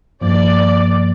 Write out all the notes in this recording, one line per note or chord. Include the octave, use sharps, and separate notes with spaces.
G2 F3 A#3 D5